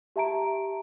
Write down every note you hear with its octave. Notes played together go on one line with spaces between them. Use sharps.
G4 E5 A5 A#5 D7